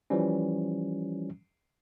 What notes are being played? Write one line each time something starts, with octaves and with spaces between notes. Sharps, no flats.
E3 F3 G3 C#4